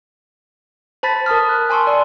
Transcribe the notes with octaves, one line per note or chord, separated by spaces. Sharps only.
C5 A5 B5 A6 B6
A#4 A5 D#6 F6
F#6
G#5 A5 C6 C#6 E6
D5 C6